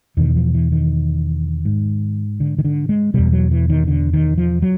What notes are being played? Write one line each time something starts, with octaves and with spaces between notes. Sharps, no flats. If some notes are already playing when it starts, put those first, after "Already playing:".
E2 B2 D#3
F3
E3
D#3
G#2
D3
D#3
D3
G#3
E2 B2 G3
F#3
E3
D#3
D3
D#3
F3
F#3